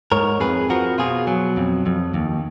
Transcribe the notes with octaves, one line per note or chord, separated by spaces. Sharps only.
G#2 A#4 C#5
F2 G#4 B4
F3 F#4 A#4
B2 F4 G#4
F#3
F2
F2
D#2